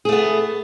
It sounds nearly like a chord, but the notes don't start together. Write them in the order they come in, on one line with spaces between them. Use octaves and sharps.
G#4 A3 B3